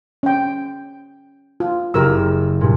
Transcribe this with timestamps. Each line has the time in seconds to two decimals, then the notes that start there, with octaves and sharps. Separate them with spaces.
0.23 C#4 G5
1.60 F4
1.94 F#1 G4 A#4 E6
2.61 G2 A#2